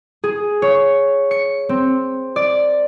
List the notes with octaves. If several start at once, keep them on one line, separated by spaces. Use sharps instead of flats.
G#4
C#5
C#7
C4
D5